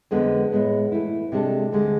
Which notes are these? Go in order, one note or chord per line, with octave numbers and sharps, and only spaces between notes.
F2 D3 G#3 B3
A2 G#3 B3
E3 A3 E4
C3 G#3 D4 A4
D2 D3 G#3